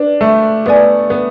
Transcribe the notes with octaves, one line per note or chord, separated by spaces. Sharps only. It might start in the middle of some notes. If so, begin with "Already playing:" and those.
Already playing: D4 B4 D5
A3
B3 B4 D5 G#5
B3